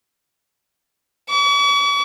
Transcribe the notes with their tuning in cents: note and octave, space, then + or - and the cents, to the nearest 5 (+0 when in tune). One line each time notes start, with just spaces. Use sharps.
C#6 +45